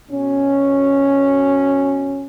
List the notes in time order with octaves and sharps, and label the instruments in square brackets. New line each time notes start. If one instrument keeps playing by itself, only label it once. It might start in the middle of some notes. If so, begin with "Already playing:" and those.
[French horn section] B2 C#4